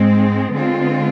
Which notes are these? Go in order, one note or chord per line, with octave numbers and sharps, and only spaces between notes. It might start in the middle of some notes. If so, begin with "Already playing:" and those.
Already playing: G#2 G#3 C4
D3 G#3 C4 F4